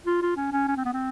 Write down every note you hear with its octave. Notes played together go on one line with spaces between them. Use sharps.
F4
F4
C#4
C#4
C#4
C4
B3
C4